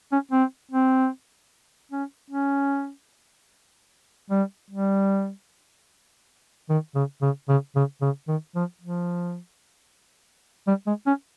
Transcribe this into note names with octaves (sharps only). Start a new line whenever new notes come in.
C#4
C4
C4
C#4
C#4
G3
G3
D#3
C#3
C#3
C#3
C#3
C#3
D#3
F3
F3
G3
G#3
C#4